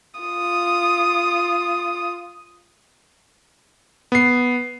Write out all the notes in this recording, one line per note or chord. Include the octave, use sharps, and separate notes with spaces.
F4 D#6
B3 C7